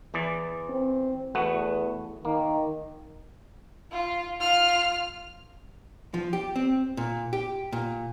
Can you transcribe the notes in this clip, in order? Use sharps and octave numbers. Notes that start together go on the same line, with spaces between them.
E2 E3 D5
C4
E2 A3 B3 F#4
D#3 A#3
F4
F4 F6
F3
G4
C4
A#2
G4
A#2